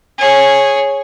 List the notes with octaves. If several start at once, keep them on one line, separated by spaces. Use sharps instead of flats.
G#4 C#5